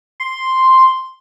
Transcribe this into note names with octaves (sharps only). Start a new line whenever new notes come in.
C6